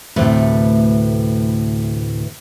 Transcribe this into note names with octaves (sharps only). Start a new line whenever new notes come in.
D2 A2 C3 A3 B4